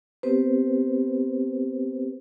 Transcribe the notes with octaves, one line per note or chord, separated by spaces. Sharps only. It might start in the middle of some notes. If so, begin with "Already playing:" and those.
B3 C4 G4 B4 C5